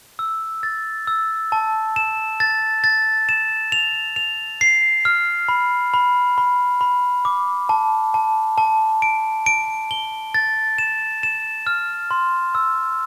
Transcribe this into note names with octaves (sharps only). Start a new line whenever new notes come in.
E6
A6
E6
A5
E7
A6
A6
E7
F7
F7
C7
F6
B5
B5
B5
B5
D6
A5
A5
A5
D7
D7
G7
A6
E7
E7
F6
C6
E6